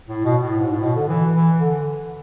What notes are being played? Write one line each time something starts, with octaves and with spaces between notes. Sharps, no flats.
A2
B2
A2
G#2
A2
B2
D3
E3
E3
D3